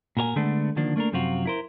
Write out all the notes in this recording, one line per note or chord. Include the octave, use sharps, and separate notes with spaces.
A#2 F#4 A#4 C#5 G#5
D3 G#3 A3 B3 D4
D3 D#3 F3 A#3 D4
A3 A#3 D4 A4 A#4
F#2 C3 F3 C4 F4 F#4
E4 A#4 C5